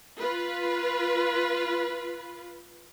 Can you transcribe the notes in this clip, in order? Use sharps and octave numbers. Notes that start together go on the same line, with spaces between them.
F4 B4